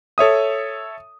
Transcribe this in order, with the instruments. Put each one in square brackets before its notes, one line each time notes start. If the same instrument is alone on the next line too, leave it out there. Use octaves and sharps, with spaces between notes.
[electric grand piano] A4 C#5 E5 D#6